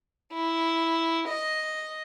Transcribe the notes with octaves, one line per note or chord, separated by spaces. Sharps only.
E4
D#5